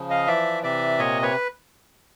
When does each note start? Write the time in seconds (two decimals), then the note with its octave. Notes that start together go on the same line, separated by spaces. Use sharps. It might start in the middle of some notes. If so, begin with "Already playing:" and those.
Already playing: C#3 F3
0.10 D#5 F5
0.27 E3 D5 E5
0.63 C3 D5 E5
0.98 A#2 C#5 D#5
1.22 B4 C#5